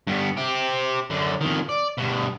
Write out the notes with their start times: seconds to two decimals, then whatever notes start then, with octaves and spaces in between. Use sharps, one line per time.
0.07 G2 B3
0.37 C4 G4
1.10 F#2 D3
1.41 F2 D#3
1.69 D5
1.98 G2 B2